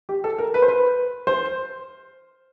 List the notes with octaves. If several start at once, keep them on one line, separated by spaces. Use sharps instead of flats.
G4
A4
A#4
B4
C5
B4
C5